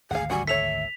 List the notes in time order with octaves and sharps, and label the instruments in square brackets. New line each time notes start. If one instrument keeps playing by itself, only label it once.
[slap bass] G#1 D2 D3 [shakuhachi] G#4 [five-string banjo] F5 F#5
[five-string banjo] G3 F#4 F#5 [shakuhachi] G#5
[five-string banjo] A4 C#5 [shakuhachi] E5 [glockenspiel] B6 F7